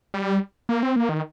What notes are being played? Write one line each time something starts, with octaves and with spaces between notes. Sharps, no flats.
G3
A#3
C4
A#3
D#3